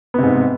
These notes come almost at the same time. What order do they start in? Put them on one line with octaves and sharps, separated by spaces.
B3 C3 G#2